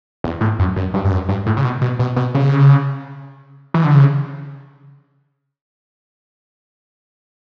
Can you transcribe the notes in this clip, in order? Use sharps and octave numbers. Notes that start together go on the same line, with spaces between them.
E2
A2
F#2
F#2
G2
G2
F#2
G2
A2
C#3
B2
B2
B2
B2
C#3
E3
D3
C#3